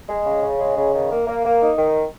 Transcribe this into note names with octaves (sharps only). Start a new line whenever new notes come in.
G#3
C#3
C#3
G#3
C#3
D#3
A#3
A#3
A#3
D#4
D#3